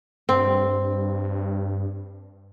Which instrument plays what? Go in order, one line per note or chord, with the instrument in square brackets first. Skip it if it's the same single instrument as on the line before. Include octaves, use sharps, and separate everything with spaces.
[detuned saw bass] G2 [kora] C4